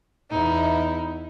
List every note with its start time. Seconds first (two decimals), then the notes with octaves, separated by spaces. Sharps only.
0.30 E2 D#4 E4